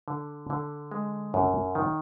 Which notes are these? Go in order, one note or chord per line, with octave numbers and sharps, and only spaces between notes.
D3
D3
G#3
F#2
D#3